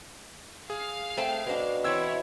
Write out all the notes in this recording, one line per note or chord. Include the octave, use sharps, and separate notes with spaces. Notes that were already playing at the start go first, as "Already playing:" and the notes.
G#4 F5
A3 C4 G5 A5
B2 G#3 D4
E3 C4 E4 C#5 E6 G#6